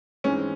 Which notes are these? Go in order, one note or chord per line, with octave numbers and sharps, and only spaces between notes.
G#2 E3 G#3 C4 C#4